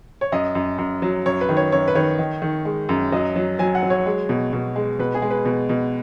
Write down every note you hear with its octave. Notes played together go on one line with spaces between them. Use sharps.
C#5
F#2 D#5
F#2
F#2
F#3
F#2 C#5
B4
D#3
C#5
F#2 C#5
B4
D#3 C#5
D#3
D#3
G#3
F#2
F#3 D#5
F#3
F#3 G#5
F#5
F#3
C#5
G#3
B2
B2
G#3
B2 B4
G#4
G#3
B4
B2
B2